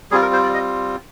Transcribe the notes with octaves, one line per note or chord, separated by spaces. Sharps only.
G3 C4 F4 G#4
A#4
C5
D5
D#5